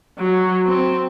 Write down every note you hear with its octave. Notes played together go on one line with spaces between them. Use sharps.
F#3
C4